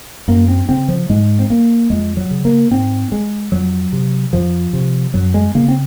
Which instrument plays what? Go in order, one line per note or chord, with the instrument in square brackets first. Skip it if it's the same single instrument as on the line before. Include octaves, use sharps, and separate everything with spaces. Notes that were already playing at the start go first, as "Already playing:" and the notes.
[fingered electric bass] F#2 A#3
C4
C#3 C4
F3
G#2 G#3
C4
A#3
F2 G#3
F#3
C#3
A#3
G#2 C4
G#3
F2 F#3
C3
F2 F3
C3
F#2 F#3
G#3
C#3 A#3
C4